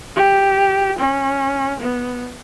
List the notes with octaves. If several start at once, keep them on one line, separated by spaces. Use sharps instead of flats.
G4
C#4
B3